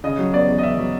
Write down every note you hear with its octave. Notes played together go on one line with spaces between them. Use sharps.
C#3 D#5
F#3
B3 D5
E2
D#5
C#3 E5
F#3